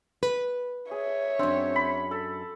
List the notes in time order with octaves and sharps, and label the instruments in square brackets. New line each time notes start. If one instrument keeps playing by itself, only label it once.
[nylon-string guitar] B4
[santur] G#4 [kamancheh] C#5 E5
[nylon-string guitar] F#2 D4 [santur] C4
[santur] B5
A4